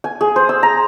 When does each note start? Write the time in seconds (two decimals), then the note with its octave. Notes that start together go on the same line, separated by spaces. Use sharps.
0.04 G#5
0.21 G#4
0.36 C5
0.49 E6
0.63 A#5